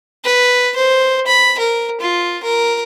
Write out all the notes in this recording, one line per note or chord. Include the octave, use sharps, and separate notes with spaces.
B4
C5
B5
A#4
F4
A#4